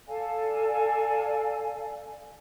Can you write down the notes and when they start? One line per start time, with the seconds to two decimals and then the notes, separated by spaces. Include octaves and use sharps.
0.07 A4 D5 F5 G#5